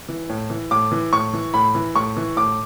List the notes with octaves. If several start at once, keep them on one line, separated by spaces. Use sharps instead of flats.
E3
A2
E3
A2 D6
E3
A2 C#6
E3
A2 B5
E3
A2 C#6
E3
A2 D6